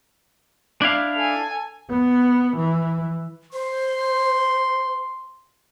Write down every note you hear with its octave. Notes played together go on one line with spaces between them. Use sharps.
D4 E4 F5
A4 G#5
B3
E3
C5 C6